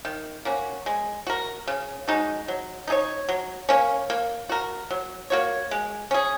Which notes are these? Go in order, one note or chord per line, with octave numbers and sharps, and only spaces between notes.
D#3
A#3 C#4 F#4
G#3
F#4 A#4
C#3
G#3 D#4 F#4
F#3
D#4 G#4 C#5
F#3
A#3 C#4
A#3
F#4 A#4
F#3
A#3 F#4 C#5
G#3
C#4 G#4